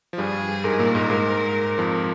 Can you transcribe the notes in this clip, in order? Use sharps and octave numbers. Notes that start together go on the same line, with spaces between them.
F3
G2 G3 G#4
G#2 G#3 A#4
A#2 A#3
G#2 G#3
G#2 G#3
F2 F3